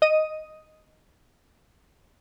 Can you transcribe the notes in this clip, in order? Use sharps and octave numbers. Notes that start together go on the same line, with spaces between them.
D#5 D#6 D#7